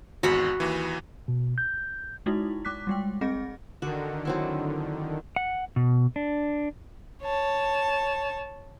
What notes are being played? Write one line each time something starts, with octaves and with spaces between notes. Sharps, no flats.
G#1 E2 F#4 B5
D#2 E3
B2
G6
G#3 D#4 E4 F#4
G#3 D6 F#6 B6
G3 G#3 G5
C4 G#4 D#5 A#6
D3 D#3 F#4
F#3 C4 E4
F#5
B2
D4
C#5 A5